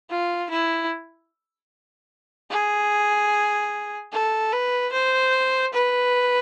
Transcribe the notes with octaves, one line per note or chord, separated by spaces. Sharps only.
F4
E4
G#4
A4
B4
C5
B4